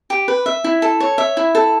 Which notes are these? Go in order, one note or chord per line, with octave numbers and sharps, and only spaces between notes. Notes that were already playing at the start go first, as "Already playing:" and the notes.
G4
B4
E5
E4
A4
C#5
E5
E4
A4